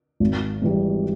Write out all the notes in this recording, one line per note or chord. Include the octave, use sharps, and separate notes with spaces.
G#1
G#2 E3 G3